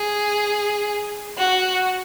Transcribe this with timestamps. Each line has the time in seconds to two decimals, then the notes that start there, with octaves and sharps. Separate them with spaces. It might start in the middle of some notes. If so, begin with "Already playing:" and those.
Already playing: G#4
1.38 F#4